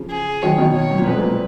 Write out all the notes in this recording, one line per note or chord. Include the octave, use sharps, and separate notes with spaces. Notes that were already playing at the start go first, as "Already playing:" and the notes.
Already playing: C#3 F3
G#4
D#3 F#3 C#5
B2 D#3
C#5
F#2
A#2
F2 G#2 B4
G#2
A#2